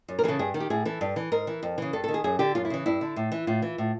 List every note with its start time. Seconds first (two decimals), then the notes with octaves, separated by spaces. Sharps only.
0.08 F#2
0.19 A#4
0.24 E3 G#4
0.28 C#3 A4
0.39 G2 G#4
0.54 D#3
0.60 G4
0.70 A2 G#4
0.85 E3 A4
1.01 G2
1.16 E3
1.32 G#2 A#4
1.47 E3
1.63 F2
1.78 C#3 E3
1.93 G2 A4
2.04 A4
2.08 D#3
2.14 G#4
2.24 F#2 G#4
2.39 D3 G4
2.55 F#2 F4
2.65 E4
2.70 C#3 E3
2.86 G2 E4
3.01 D3
3.16 A2
3.32 E3
3.47 A2 F4
3.62 E3
3.78 A2